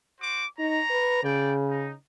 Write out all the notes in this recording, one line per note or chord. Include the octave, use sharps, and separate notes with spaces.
F#4 C5 D6
D#4 C#5 A#5
B4
C#3 D5 G5
D#4